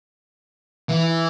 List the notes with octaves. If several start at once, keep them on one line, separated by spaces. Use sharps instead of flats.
E3